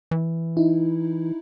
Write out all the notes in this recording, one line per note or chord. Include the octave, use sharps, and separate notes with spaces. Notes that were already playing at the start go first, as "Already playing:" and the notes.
E3
D#4 E4